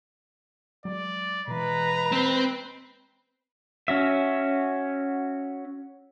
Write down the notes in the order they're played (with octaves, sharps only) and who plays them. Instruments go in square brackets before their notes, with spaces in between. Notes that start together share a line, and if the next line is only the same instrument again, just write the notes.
[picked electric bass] F#3 G#3 [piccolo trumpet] D5
[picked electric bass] B2 E3 [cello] G#3 B4 [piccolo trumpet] A#5
[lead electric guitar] C4
[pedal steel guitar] C#4 F#4 E5